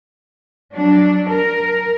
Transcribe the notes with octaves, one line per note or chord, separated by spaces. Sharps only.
F#3 D4
A#4